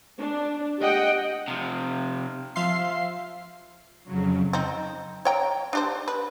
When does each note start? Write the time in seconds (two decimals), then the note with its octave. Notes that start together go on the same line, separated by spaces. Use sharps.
0.18 D4
0.78 G4 D#5 F#5 G5
1.48 C3 F3
2.56 F3 E5 F5 C6 C7
4.07 F2 C#3 F#3
4.53 C4 D#4
5.25 C#5 G5 A#5
5.73 D4 G4 C5
6.08 B4